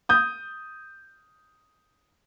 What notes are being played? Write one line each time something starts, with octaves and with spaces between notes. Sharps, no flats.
D#6 G6